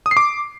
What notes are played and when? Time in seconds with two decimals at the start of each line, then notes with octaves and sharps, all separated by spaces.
0.06 D#6
0.11 C7
0.17 D6